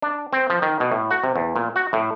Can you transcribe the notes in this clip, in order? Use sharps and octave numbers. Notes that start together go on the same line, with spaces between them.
D4
C4
F3
D#3
B2
A2
F#4
C3
E2
A#2
F#4
A2